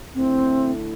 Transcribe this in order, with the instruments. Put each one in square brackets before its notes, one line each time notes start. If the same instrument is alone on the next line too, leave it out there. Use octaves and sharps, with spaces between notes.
[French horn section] D3 A3 E4 [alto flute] C4